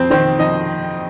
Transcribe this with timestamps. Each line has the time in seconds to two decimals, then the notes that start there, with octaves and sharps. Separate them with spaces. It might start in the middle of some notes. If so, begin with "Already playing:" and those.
Already playing: F2 C4 C5
0.10 D#3 C4 C5
0.39 F2 D#4 D#5